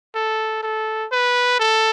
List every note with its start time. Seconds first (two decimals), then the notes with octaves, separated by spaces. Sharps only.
0.15 A4
0.63 A4
1.12 B4
1.60 A4